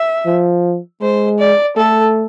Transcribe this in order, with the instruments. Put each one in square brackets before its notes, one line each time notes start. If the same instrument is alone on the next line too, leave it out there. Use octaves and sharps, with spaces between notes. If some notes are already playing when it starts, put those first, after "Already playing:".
Already playing: [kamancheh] E5
[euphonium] F3
[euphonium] G#3 [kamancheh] C5
[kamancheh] D5
[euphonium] A3 [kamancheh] A4